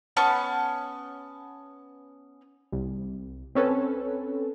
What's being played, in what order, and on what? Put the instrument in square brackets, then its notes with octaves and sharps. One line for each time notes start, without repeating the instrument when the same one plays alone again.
[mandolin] B3 C#4 A5 C#6
[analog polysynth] C2
C4 C#4 A4 B4